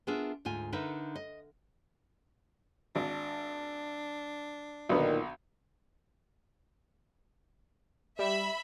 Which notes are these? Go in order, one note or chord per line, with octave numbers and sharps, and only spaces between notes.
B3 D4 F4 G#4 A#4 E5
D2 G#2 F4 G#5
D3 D#4 A#4 B4 E5
D#5
G#1 D4
B1 A#2 D3 D#3 B3
G3 E5 B5